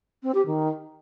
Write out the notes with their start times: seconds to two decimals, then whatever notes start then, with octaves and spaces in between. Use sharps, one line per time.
0.23 C4
0.34 G4
0.46 D#3